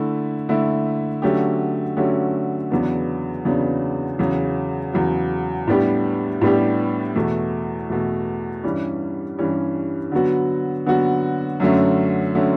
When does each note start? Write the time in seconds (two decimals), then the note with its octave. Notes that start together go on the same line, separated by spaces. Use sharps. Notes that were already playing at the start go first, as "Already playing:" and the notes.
Already playing: D3 A3 E4
0.49 D3 A3 E4
1.22 D3 F#3 A3 C#4 G4
1.96 D3 F#3 A3 C#4 G4
2.70 E2 C#3 F#3 B3 D4
3.45 E2 C#3 F#3 B3 D4
4.19 E2 C#3 F#3
4.93 E2 C#3 F#3
5.68 A2 G3 B3 D4 G4
6.42 A2 G3 B3 D4 G4
7.16 E2 B2 A3
7.90 E2 B2 A3
8.63 G2 E3 G3 C#4
9.38 G2 E3 G3 C#4
10.12 D3 F#3 B3 F#4
10.86 D3 F#3 B3 F#4
11.60 F#2 D3 F#3 A3 C#4
12.35 D3 F#3 A3 C#4